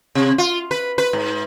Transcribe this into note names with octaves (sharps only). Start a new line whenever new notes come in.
C3
F4
B4
B4
G#2